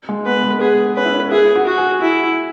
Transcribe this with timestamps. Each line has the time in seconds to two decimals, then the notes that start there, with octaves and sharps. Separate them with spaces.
0.09 G#3
0.26 B3 B4
0.44 G#3
0.61 B3 G#4
0.96 C#4 B4
1.05 E4
1.14 C#4
1.31 E4 G#4
1.55 F#4
1.67 F#4
1.78 G#4
2.02 E4